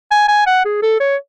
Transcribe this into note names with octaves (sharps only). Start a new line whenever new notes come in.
G#5
G#5
F#5
G#4
A4
C#5